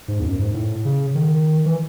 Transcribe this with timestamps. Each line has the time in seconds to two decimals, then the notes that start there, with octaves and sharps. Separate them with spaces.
0.08 G#2
0.20 E2
0.24 F#2
0.39 G#2
0.54 A2
0.85 C#3
1.15 D#3
1.66 E3